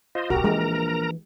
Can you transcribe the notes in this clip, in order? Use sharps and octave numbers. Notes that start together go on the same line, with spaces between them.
F4 C5 D#5
D1 B1 F#4 G4 A#4 A#5
A#1 E3 G#3